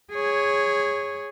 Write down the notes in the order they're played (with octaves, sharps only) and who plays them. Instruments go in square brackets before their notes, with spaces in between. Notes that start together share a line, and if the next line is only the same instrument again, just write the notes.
[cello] G#4 C#5